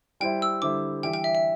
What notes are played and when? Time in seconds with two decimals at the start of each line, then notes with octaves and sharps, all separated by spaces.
0.20 G3 E4 C5 E5 G5
0.42 E6
0.62 D3 G3 E4 C5 E5 D6
1.03 E3 G3 D4 G4 E5 G5
1.14 G5
1.24 E5
1.35 E5